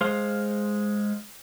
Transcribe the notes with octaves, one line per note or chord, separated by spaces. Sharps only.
G#3 C5 F5